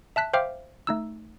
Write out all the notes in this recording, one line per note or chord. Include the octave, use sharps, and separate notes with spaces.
E5 A5 F#6 B6
C5 E5 F5 G5 D6 F6
A3 D#4 E6